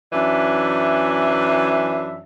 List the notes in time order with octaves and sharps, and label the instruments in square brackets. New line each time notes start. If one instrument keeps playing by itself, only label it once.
[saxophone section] F#2 E3 D4 E5